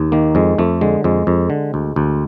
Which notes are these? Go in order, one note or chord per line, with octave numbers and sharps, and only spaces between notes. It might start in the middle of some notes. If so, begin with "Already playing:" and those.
Already playing: D#2
D#3 A#3
F2 G#3
F2 A3
D3 G#3
F2 G#3
F2
D3
D2
D2